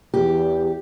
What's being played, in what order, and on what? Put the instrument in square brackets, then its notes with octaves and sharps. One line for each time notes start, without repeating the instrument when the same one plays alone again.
[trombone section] E2 [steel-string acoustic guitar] G4